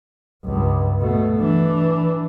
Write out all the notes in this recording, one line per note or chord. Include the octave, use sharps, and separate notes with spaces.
C#2 G2
B2 A3
E3 D4